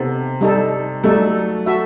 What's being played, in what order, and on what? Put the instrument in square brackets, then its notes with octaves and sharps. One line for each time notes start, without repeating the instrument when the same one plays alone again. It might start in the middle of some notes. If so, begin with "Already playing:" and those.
Already playing: [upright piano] C3 [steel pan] B3 D#4 A4 C5
[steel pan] G3 D#4 A4
[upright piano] F#3 A3 [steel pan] G3 D#4 A4
[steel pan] F#4 A4 E5